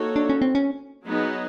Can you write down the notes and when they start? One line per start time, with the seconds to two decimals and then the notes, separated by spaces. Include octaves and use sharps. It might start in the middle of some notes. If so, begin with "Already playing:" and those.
Already playing: A#3 D#4 F#4 A4 C#5
0.16 D4
0.30 C#4
0.42 C4
0.55 C#4
1.06 F#3 B3 D#4 G#4